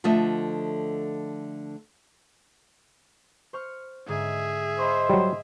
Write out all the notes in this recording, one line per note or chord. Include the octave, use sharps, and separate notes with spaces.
D3 F3 A3 D#5 E5
C5 C#6 F6
G#2 D3 G#4 E5
C5 D#5 B5 C#6
F#3 G3